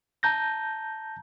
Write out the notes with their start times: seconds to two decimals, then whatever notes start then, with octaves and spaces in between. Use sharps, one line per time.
0.23 A5 A#5 G6 A#6